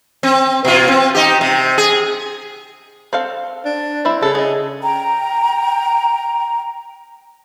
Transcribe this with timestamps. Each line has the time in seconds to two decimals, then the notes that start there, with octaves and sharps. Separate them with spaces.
0.23 C4
0.65 B2 F4
0.88 C4
1.15 D#4 G4
1.41 C3
1.78 G#4
3.13 C4 A4 F5
3.65 D4
4.05 G3 C4 E4
4.22 C#3 A4
4.35 G#4 D#5
4.83 G5 A#5